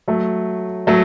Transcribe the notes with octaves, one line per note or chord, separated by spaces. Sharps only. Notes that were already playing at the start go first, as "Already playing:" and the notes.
F#3 A3
F#3 A3